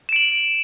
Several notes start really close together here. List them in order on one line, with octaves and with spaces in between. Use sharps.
E7 D7 F#7